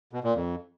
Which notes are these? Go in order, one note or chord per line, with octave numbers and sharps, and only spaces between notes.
B2
A#2
F2